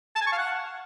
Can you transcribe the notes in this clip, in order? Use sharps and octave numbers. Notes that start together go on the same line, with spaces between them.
A5
G#5
C#6
F5
F#5